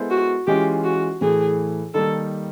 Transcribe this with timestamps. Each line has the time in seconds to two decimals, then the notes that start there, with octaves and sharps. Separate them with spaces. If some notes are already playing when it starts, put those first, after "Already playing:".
Already playing: G#3 B3 E4 A4 C5
0.11 F#4
0.47 E3 G#3 C#4 F4 G4
0.84 F#4
1.21 A2 E3 A3 G#4
1.94 D#3 G3 A#3 A4